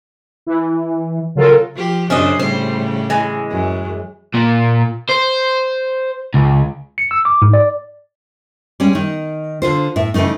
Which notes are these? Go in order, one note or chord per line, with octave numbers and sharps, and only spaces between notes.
E3
C#3 F#3 F4 A4 A#4
F3 G4
F#2 C#3 C#4 D4 C5 D#5
A2 C#3 G3 C5
E3 G#3
F#2
A#2
C5
C#2
C#7
E6
D6
G#2
D5
G3 G#3 C#4
D#3 D#4
D3 F4 C5
A2 E5
C#3 E3 F#3 A3 D#4